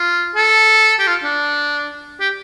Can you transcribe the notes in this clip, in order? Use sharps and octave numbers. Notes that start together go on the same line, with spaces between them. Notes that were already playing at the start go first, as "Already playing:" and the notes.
Already playing: F4
A4
G4
F4
D4
G4